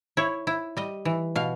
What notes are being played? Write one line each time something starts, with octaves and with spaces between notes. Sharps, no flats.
E4 C#5
E4
G3 D#5
E3
B2 F5